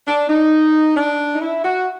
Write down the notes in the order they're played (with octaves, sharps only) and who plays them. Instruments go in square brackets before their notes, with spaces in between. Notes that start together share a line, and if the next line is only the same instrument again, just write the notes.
[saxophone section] D4
D#4
D4
D#4
E4
F#4